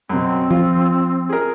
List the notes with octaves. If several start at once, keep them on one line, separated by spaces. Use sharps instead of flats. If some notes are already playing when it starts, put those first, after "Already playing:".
F#2 B2 C4
F3 F4
G#4 A#4